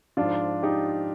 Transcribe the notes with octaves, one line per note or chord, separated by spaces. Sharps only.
G#2 F3 D4 F4
D#4 G4